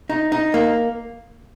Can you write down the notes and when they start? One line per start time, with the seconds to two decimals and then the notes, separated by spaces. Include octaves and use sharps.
0.10 D#4
0.32 D#4
0.54 A#3